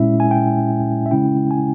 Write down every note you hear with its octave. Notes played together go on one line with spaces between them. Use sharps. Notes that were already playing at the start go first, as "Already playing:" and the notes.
Already playing: A#2 G#3 C#4 E4 E5
G#5
G5
E5
C#3 G#3 C#4 E4 G5
G#5